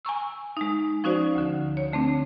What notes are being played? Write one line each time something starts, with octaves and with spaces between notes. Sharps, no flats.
G#5 A#5 C#6 E6
G#3 D#4
F3 C#4 D#4 F#4 C5 D5
D2 D3
C#5
D3 A3 C4 D4